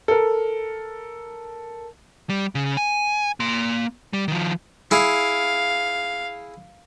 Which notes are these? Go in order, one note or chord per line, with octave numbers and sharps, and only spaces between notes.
A4 A#4
G3
C#3
G#5
A#3 C6
G3
D#3 F3
E4 G#4 F5